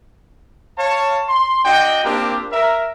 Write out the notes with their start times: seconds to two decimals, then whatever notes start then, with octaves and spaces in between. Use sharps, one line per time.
0.78 C#5 F5 A5
1.29 C6
1.65 D4 F#4 D#5 F#5 G5
2.05 A#3 C4 D4 F4 G4 A#4
2.52 A#4 E5